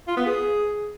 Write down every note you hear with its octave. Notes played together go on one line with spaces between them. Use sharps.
F4
B3
G#4